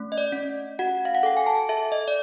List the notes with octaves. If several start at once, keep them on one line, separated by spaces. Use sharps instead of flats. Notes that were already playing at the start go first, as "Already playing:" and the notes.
Already playing: A3 C#4
D#5
D5
C#4
F#4 F#5
F5
F#5
A4 G5
G#5
A5
A4 E5
D#5
D5